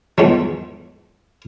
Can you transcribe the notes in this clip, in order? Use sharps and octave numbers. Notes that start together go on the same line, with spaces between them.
E2 G#2 F3 F#3